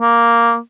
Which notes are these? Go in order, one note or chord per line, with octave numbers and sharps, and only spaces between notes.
A#3